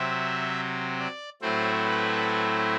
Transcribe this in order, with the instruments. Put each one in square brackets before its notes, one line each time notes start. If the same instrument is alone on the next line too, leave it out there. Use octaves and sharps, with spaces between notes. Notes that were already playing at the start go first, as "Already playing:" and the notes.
Already playing: [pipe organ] C3 F#3 C4 E5
D5
A2 F#3 A3 C4 E4 C5
B4